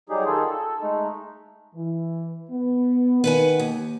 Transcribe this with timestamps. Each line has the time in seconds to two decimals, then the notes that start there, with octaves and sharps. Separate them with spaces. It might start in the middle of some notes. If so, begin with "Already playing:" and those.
0.09 F#3 G3 D#4 G4 G#4
0.26 D#3 D#4 F4 G#4 A4
0.49 A4
0.82 G#3 A3 D#4
1.75 E3
2.51 B3
3.24 D#3 B4 F#5 G#5
3.59 D#2